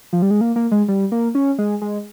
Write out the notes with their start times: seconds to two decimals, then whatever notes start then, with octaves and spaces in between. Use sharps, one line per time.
0.13 F3
0.22 G3
0.31 G#3
0.41 A#3
0.56 A#3
0.71 G#3
0.88 G3
1.12 A#3
1.35 C#4
1.58 G#3
1.82 G#3